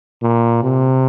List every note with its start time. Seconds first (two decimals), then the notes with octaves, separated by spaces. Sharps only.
0.22 A#2
0.63 C3